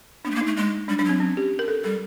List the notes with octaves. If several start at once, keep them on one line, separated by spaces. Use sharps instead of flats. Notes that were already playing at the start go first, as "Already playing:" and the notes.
B3 D4
A3
A#3
D#4
A3
G#3
G3 D4
G3 D4
F#3 C4
C#4
G4
A#4
A4
G3 A4